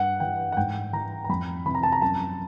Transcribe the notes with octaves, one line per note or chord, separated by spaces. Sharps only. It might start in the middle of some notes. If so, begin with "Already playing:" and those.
Already playing: G2 F#5
E3 G5
F#5
G#2 G5
E3 A#5
A#5
F2 B5
C3 E3 B5
A#5
A5
A#5
F#2 A5